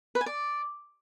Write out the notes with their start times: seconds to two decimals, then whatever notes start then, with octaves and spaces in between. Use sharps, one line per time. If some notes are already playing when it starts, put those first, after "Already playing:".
0.15 B4
0.21 G#5
0.26 D5